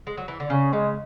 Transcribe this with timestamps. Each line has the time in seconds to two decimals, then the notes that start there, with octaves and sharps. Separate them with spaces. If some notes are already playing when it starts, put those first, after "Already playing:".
0.07 G#3
0.17 F#3
0.28 E3
0.40 D3
0.50 C#3 C#4
0.72 C#3 G#3